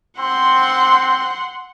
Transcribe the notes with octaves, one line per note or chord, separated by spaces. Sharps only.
C4 F#5 C6